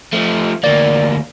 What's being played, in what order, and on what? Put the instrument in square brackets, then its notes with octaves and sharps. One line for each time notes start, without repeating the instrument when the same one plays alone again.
[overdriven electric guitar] F3 A3
[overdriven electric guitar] D2 A#3 [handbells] D5